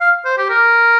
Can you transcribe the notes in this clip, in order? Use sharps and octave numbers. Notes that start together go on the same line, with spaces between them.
F5
C5
G4
A#4